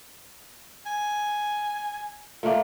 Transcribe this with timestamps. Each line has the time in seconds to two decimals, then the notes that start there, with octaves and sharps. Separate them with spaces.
0.86 G#5
2.43 A#2 A3 A#3